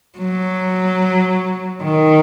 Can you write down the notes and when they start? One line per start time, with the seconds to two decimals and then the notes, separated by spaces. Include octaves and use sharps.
0.18 F#3
1.83 D#3